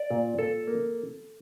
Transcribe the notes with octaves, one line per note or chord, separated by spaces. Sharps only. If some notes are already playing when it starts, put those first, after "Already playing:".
Already playing: D5
A#2
A#2 A4
A#3